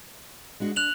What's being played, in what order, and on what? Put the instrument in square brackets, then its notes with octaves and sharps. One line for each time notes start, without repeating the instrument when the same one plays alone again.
[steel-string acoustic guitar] G#3 D4 F#4
[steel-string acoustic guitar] D4 [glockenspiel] F#6 F7 F#7